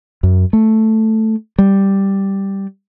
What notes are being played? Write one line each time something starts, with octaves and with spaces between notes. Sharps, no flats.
F#2
A3
G3